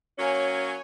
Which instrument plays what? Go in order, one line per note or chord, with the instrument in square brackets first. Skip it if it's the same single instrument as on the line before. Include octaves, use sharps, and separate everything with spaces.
[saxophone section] F#3 A#3 C#4 [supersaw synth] C#5 G#5